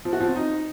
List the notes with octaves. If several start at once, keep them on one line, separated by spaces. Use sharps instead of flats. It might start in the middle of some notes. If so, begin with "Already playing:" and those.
F3
F#4
F3
C4
D#4